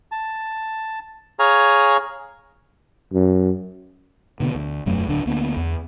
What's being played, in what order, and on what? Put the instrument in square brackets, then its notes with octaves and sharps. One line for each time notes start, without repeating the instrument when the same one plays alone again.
[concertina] A5
G#4 C#5 F5 G#5 A#5
[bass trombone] F#2
[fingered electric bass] B2 D3 A#3 B3
D2
E1 F#2 F#3 A3
D1 D3 D4
D2 A#3 B3
E2